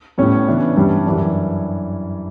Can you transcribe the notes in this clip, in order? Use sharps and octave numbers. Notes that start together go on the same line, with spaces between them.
A2 G3 B3 C#4 C#5
C#3 E3 B3 D4
G2 E3 G3 D4
F#2 E3 G3 D4